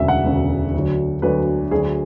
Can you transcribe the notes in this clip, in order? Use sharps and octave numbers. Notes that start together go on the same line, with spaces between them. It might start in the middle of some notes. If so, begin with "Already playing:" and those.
Already playing: E1 D2 C#3 E5
F#5
E1 D2 C#3
D2 D3 F#3
D2 D3 F#3 B4
D2 D3 F#3 G#4